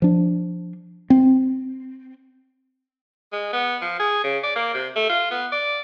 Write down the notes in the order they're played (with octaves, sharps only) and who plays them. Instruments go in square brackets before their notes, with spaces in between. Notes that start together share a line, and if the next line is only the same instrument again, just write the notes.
[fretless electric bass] F3 D4
C4
[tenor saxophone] G#3
B3
F3
G#4
C#3
D5
A#3
C3
A3
F4
B3
D5